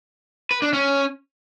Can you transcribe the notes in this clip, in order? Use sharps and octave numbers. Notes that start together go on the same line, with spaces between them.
B4
D4
C#4